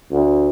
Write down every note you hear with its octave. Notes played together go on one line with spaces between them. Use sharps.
D2